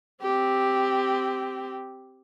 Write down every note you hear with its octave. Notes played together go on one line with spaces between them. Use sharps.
C4 G4